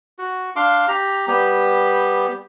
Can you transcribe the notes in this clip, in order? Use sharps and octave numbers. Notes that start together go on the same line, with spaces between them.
F#4
D4 F5 C6 D6
G4 A#5
G3 B3 G4